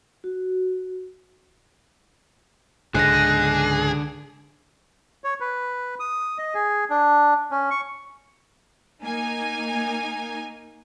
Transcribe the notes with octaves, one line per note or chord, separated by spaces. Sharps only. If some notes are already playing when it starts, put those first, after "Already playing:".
F#4
C#2 G#2 D3 G#4 F#6 A#6
C#5
B4
D#6
D#5
G#4
D4
C#4
C#6
A#3 D#4 G#5